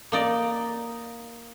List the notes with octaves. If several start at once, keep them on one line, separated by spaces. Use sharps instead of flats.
A#3 D#4 D5